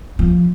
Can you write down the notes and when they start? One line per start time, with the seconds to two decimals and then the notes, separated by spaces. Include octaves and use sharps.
0.19 F3